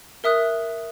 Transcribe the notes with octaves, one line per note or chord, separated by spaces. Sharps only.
A#4 E5 D#6 F#6